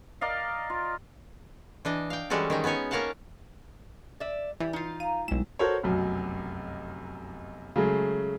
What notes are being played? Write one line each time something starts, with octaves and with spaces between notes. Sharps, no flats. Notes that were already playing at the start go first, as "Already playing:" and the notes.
A#4 D5 D#5 F5
F4
E3 D4 D#5
F5 G5
E3 G3 G#3 C#4 F#4 A4
D#3 C#4 D#4
B3 C#4 D#4 C#5 G#5
A#3 C#4 A#4 F5 F#5 A5
D5 E5
E3 G3
D#4 F4
F5 A#5 D#7
B1 G3 G#3 E4 E7
F#4 A4 A#4 C5 C#5
F1 B1 F#2
C#3 F#3 G#3 A3